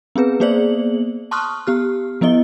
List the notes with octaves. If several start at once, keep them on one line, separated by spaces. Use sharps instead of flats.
B3 C4 G#4 B4
A#3 B3 G#4 C5 D5 F#7
A5 C6 C#6 D#6 F6 F#6
B3 G4 F6
F3 B3 E4 D#5 G7